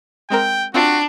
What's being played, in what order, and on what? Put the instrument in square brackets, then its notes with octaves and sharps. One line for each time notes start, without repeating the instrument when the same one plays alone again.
[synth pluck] G#3 C4 A#4 [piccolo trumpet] G5
[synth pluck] C4 F4 [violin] D4 [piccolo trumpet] F#4